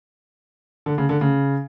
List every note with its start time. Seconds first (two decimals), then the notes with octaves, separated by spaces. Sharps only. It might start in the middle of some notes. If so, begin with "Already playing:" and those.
0.86 D3
0.98 C#3
1.09 D3
1.21 C#3